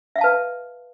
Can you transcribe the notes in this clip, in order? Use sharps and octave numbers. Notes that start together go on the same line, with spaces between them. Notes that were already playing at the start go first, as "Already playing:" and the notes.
B4 E5 F5 A5